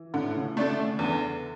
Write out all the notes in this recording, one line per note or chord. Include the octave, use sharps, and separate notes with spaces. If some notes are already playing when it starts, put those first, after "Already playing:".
Already playing: E3
A2 D3
C#3
D3 A3 D4 A4
C#3
E2 D3